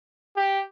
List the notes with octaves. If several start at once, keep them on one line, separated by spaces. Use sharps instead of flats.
G4